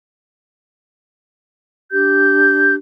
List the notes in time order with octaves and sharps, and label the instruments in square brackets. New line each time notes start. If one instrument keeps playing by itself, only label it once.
[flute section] D4 G4 G6